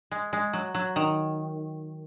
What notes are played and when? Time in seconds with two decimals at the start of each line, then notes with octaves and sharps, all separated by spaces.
0.11 G#3
0.33 G#3
0.53 F#3
0.75 F#3
0.96 D#3